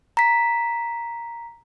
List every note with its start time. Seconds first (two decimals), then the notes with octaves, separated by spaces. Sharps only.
0.17 A#5 B6